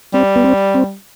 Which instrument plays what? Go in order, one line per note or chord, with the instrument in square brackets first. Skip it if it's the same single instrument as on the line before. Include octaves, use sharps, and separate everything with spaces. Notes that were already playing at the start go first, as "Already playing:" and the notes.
[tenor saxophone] G3 [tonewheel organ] C4
[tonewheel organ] B3
C4
C4